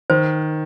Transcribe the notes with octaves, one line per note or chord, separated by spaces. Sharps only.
D#3 C5